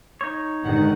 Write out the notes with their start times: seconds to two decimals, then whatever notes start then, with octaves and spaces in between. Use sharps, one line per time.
0.21 D#4 C#5
0.63 G1 A2 D3 D#3 G#3 F#5